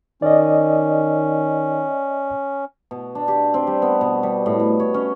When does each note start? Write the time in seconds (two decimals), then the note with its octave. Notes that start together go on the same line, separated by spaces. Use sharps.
0.22 D#3 C#4 D5 D#5
2.91 B2
3.15 D4
3.28 G4
3.54 C4
3.67 G3
3.82 B3
4.01 B2
4.23 G3
4.46 A2
4.60 B2
4.80 C#5
4.94 C#4